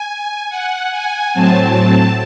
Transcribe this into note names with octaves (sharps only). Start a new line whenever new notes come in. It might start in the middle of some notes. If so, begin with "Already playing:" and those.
Already playing: G#5
F#5
G#5
A2 F#3 C4 A5